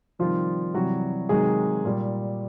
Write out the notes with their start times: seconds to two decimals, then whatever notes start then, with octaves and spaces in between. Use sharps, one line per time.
0.19 C3 D#3 F3 G3 F4
0.74 C3 E3 F#3 G3 F#4
1.29 C3 D#3 F#3 G#3 G#4
1.85 A#2 G3